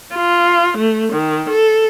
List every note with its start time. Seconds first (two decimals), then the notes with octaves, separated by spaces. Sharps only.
0.14 F4
0.78 A3
1.12 D#3
1.49 A4